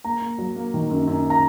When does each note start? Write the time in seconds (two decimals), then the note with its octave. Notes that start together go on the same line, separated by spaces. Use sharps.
0.05 A#3 A#5
0.22 A#3
0.38 F#3
0.56 A#3
0.74 D#3
0.90 F#2
1.08 F#2
1.30 A#5